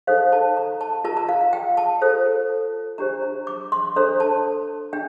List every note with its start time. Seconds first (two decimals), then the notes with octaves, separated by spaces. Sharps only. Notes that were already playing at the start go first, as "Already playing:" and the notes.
0.07 D#4 A4 C5 F5
0.32 A5
0.57 A#5
0.81 A5
1.04 F4 A#4 A5
1.17 A#5
1.29 F5
1.41 F5
1.53 G5
1.77 A5
2.01 F4 A4 C5
2.98 D4 G4 C5 A#5
3.22 A#5
3.47 D6
3.72 C6
3.96 D4 A4 C5 A#5
4.20 A5
4.93 D4 G5